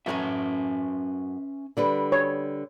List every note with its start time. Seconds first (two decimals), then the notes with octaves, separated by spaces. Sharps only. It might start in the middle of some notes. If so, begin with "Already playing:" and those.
0.06 F#2 C#4 F#4 B4 E5 G#5
1.77 D3 G3 B4
2.12 C#5